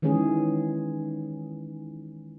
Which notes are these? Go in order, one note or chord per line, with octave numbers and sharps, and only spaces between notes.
D#3 E3 G#3 C#4 G#4